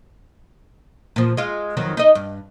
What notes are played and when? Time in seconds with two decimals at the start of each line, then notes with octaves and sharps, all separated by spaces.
1.16 A#2 F3
1.37 G#3 F4
1.77 F2 D#3 F#3
1.97 D#4 D#5
2.15 G2